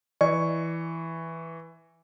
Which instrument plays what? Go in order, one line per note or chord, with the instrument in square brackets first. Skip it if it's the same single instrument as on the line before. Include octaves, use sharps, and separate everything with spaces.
[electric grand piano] E3 C#6 [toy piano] D5